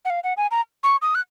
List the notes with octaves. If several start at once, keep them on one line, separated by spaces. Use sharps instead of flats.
F#5
F5
F#5
G#5
A#5
C#6
D#6
F#6